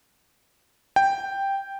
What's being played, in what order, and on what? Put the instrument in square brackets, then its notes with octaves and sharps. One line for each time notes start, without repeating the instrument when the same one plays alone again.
[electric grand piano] G5